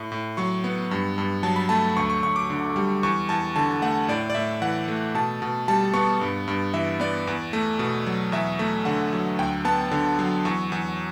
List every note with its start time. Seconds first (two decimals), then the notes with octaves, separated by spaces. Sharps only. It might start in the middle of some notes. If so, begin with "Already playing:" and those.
Already playing: A2
0.12 A2
0.37 F#3 C#6
0.64 B3
0.91 G2
1.18 G2
1.43 F#3 A5
1.56 B5
1.69 A3 A5
1.97 D2 C#6
2.10 C#6
2.23 D2 C#6
2.36 D6
2.50 D3
2.76 G3
3.03 E2 C#6
3.29 E2 A5
3.56 D3 A5
3.82 A3 F#5
4.08 A2 D5
4.30 D5
4.35 A2 E5
4.62 E3 F#5
4.88 A3
5.15 B2 A5
5.42 B2
5.68 G3 A5
5.94 B3 C#6
6.21 G2
6.48 G2
6.74 E3 E5
7.00 B3 D5
7.27 E2
7.53 A3
7.79 B2
8.06 F#3
8.32 E2 E5
8.59 A3
8.85 D3 F#5
9.13 F#3
9.39 D2 G5
9.65 B3 A5
9.91 D3
10.19 F#3
10.45 E2 C#6
10.72 E2